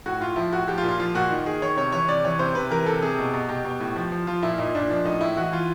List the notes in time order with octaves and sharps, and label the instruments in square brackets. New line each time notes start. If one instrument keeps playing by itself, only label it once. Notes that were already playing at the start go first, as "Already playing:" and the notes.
[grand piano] A2 F#4
A2 F4
F3 E4
A2 F#4
F3 G4
F4
A#2
F4
F3 F4
A#2 F#4
D#3
D#3 G#4
D#3 C#5
C3 C#5
E3 C#5
C3 D5
E3 C#5
C3 C5
C3 B4
E3 A#4
C3 A4
C3 G#4
B2
B2
B2 G4
B2
A2
F3
F3
F3 F4
A#2 E4
A#2 D#4
A#2 D4
F3 D4
A2 D#4
A2 E4
E3 F#4
E3 F4